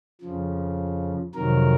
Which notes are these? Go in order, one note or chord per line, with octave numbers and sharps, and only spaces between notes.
F2 C#3 F3
F2 C3 D#3 F#3 A#4